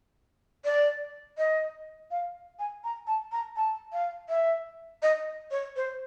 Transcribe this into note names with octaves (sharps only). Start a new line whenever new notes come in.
D5
D#5
F5
G#5
A#5
A5
A#5
A5
F5
E5
D#5
C#5
C5